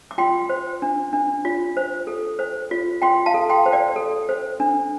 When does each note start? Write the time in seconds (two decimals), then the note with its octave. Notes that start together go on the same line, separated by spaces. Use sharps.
0.11 D6
0.18 F4 G5 C6
0.49 C5
0.82 D4
1.13 D4
1.45 F4
1.77 C5
2.07 A4
2.39 C5
2.71 F4
3.02 F4 G5 C6
3.26 F5 A5
3.34 A4
3.49 G5 C6
3.66 C5
3.72 D5 G5
3.96 A4
4.29 C5
4.60 D4